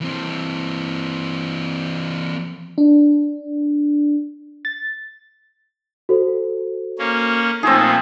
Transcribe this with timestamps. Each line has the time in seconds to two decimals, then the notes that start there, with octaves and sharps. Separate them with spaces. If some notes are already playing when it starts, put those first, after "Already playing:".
0.01 E3 C4
2.78 D4
4.65 A6
6.09 F#4 A4 C5
6.99 A#3 C#4
7.63 A#2 F3 A3 C4 D#4 G#4